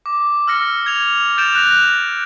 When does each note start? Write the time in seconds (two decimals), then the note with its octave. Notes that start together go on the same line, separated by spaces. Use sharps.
0.06 D6
0.47 E6 F6 A#6 C#7
0.86 G#6 F7
1.38 G6 A6 D7 E7 F7
1.55 F#6 G6 A#6 F7